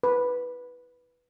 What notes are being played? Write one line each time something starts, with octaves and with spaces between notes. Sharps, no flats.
B4